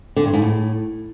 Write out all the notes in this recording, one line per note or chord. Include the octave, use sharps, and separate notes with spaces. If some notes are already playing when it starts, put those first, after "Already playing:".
D3
G2
G#2
A2